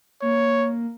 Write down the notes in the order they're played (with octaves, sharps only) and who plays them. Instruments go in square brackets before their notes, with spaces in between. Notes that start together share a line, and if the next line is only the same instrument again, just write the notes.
[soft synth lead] A#3 [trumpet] C#5